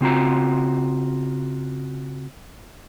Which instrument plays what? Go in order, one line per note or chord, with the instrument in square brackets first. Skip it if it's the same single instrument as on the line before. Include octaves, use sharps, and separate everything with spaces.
[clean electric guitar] C#3 C4 F4 F#4 A#5